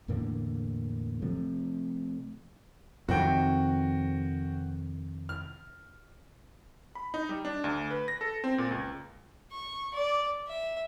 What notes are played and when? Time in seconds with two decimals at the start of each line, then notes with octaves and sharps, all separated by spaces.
0.08 E2 A2 D3 A#3
1.22 C3 F3 A3
3.09 F2 C3 D#3 F#4 G5
5.29 F6
6.95 B5
7.14 D#4
7.29 G3
7.45 D4
7.64 D2
7.90 B4
8.08 A#6
8.21 A4
8.44 C4
8.58 A#2
8.71 C#2
9.52 C#6
9.94 D5
10.47 E5